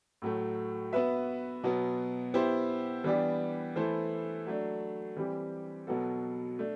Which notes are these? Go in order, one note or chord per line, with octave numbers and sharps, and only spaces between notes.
A2 F#3 A3
B3 F#4 B4 E5
B2 F#3 B3
B3 E4 G4 C5
E3 G3 B3 D4 G4
E3 A3 E4 A4 C5
F#3 A3 D4
E3 G3 C4 G4
B2 F#3 B3 F#4 A4
A3 D4